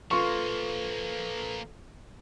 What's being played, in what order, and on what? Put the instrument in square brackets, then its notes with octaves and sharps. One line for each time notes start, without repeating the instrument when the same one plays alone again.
[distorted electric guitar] F3 A#3 [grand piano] F4 C#6 [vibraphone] A4 B4